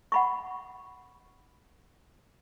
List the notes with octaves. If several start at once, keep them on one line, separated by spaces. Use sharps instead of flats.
F#5 B5 C#6